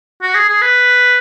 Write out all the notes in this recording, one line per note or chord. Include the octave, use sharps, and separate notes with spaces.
F#4
G#4
G#4
B4